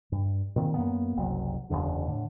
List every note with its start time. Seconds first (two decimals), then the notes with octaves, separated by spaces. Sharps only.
0.12 G2
0.56 A#2 D#3 C4
0.74 F#2 A#3 B3
1.17 F#1 C2 F#3
1.70 F#1 B1 E2 D3
2.07 A2 D3